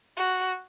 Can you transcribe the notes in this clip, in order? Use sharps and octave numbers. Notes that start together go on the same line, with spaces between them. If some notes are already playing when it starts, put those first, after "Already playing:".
F#4